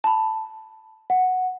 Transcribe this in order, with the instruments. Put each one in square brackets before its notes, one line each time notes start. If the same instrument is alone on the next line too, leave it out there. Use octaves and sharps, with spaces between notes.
[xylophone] A5 B5
[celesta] F#5